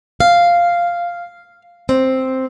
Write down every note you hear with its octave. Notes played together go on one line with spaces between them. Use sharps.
F5
C4